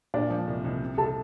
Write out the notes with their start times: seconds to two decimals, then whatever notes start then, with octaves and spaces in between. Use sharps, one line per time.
0.14 A#2 D4 D5
0.30 F3
0.47 C2
0.64 C2
0.81 C3
0.98 C2 A4 A5